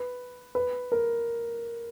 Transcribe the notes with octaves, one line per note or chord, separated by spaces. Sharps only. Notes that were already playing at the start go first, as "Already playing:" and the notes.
Already playing: B4
B4
A#4